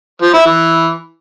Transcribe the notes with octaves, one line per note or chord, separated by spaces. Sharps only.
F3
E4
E3